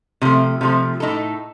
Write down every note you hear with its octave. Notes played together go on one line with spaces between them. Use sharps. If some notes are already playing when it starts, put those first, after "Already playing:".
C3 F3 A3
C3 F3 A3
A2 A3 D#4 A4